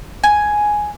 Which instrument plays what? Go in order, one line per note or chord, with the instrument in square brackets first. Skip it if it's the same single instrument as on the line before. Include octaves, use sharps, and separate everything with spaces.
[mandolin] G#5